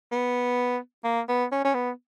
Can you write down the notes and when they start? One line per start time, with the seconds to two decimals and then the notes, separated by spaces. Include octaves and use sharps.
0.12 B3
1.04 A#3
1.29 B3
1.52 C#4
1.65 C#4
1.74 B3